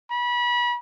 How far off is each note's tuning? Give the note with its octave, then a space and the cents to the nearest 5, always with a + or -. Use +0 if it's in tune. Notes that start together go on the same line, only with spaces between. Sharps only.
B5 -30